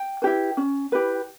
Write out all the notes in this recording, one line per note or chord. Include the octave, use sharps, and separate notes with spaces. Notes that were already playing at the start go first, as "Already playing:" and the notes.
Already playing: G5
E4 G4 B4
C#4
E4 G4 B4